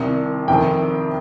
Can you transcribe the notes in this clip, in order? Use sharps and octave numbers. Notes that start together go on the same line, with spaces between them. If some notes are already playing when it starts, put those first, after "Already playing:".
Already playing: C2 C3 D#3
F2 C3 D#3 G5